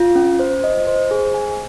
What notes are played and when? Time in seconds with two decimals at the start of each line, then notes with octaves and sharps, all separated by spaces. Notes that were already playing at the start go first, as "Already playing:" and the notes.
Already playing: F4
0.15 C#4
0.39 C5
0.64 D#5
0.87 C5
1.11 G#4
1.34 G#5